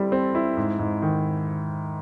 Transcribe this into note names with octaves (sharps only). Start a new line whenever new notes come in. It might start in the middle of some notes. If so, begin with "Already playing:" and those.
Already playing: G3 C4 E4 A4
C4
E4
G#2
G#2
D#3